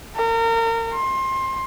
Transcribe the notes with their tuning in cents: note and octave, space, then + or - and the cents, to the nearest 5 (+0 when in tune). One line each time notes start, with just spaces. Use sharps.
A#4 -30
C6 +25